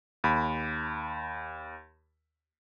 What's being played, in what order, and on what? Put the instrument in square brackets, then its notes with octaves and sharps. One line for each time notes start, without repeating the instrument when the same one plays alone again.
[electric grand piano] D#2 B5